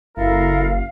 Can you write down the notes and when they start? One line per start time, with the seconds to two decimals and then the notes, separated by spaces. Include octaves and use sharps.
0.17 F#1 E4 A4 A#4 F5